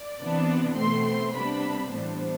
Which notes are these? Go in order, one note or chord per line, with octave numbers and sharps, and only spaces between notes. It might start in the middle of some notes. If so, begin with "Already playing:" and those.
Already playing: D5
C3 E3 B3 D4
B2 A3 C4 C6
C6
C3 G3 B3 D4 B5
A2 E3 G3 B3 D4 C5